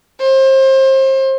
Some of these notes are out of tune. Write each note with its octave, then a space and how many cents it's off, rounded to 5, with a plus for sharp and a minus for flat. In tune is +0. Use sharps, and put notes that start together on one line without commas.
C5 +30